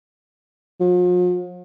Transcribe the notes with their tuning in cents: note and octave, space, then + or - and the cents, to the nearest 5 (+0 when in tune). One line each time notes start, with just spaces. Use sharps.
F3 +45